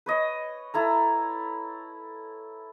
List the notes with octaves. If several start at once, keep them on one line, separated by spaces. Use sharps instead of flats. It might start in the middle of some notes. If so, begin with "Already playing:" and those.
B4 C#5 D#5
E4 A4 A#5